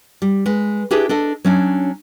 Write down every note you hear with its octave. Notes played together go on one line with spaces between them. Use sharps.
G3
G#3 B4
D4 E4 G4 G#4 B4
D4 A4 D#5
F#3 C#4 D4